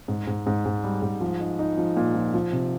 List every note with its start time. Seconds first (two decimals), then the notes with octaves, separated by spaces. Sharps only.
0.08 G#2
0.27 G#2
0.46 G#2
0.65 G#2
0.84 G3
1.02 G#2
1.21 F3
1.40 D#4
1.59 D#4
1.78 F3
1.96 A#2
2.14 F3
2.34 F3
2.52 C3